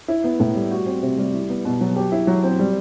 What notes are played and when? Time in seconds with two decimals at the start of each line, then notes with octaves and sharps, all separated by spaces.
0.08 E4
0.24 B3
0.40 A2
0.56 G3
0.71 F#4
0.86 C4
1.03 C3
1.18 G3
1.34 E4
1.49 B3
1.65 B2
1.81 F#3
1.96 G4
2.12 E4
2.27 F#3
2.44 C4
2.59 G3